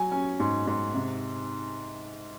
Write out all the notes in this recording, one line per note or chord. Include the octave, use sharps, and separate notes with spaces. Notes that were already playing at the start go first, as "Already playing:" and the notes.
Already playing: F#3 G#5
C#4
G#2
G#2
C3